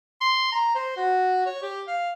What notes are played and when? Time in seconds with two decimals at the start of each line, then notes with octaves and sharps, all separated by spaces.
0.21 C6
0.52 A#5
0.75 C5
0.97 F#4
1.46 C#5
1.62 G4
1.87 F5